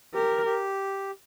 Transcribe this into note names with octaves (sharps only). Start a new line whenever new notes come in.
G4 A#4
G4